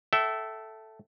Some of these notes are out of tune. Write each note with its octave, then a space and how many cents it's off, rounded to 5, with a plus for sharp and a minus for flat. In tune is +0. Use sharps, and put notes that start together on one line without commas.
A4 +0 E5 +0 G5 -40